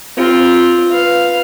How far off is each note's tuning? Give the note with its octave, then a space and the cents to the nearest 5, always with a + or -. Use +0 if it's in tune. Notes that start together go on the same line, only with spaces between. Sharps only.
C4 +0 F4 +0
B4 +0 F5 +0